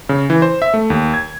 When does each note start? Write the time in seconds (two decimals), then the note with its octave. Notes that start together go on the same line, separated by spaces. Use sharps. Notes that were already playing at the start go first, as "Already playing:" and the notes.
0.09 C#3
0.30 E3
0.42 C5
0.62 E5
0.74 A3
0.90 D#2
1.14 G#6